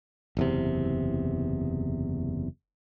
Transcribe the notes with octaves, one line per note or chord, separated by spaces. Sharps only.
F#1 E2 C3